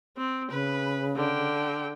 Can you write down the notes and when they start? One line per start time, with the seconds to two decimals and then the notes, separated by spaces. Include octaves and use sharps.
0.17 C4
0.50 C#3 B4
1.16 D3 G5